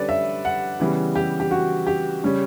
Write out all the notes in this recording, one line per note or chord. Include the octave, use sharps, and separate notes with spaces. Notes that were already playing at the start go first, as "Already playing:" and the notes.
Already playing: D3 G3 C#4 A4 B4 D5
E5
F#5
C#3 E3 G3 B3
G4
G4
F#4
G4
C#3 G3 C#4